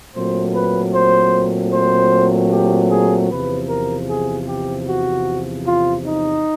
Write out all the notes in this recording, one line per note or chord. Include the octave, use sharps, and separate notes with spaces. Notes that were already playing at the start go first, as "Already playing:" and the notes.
A#2 F#3 A3 C4 C5
B4
C5
C5
G4
G#4
E2 C3 F3 B4
A#4
G#4
G4
F#4
F4
D#4